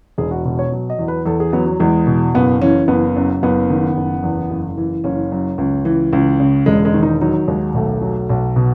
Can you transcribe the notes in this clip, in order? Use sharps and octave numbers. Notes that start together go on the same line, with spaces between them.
E1 G#4
F#4
B2 F#4
C#5
F#3
D#5
E2
B4
E2 A4
G#4
F#3 B3
F#3
E2 G#3
B2
F#1 B3
E3 C#4
F#1 B3
F#2
F#1 B3
D#3
F#1
E2
F#1
E3
F#1 C#4
F#2
C#2
E3
C#2
C#3
E1 G#3
G#3
D#3
D#4
F#3 D#4
D#2 G#3
B1 A3
F#3
B1
B2